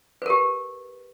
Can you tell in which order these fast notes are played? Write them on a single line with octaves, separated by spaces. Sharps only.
B4 A#4 G4